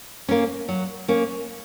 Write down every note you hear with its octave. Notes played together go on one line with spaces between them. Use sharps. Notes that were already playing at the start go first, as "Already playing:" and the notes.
A#3 C#4
F#3
A#3 C#4